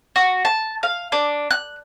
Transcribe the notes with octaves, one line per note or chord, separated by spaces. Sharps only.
F#4
A5
F5
D4
F#6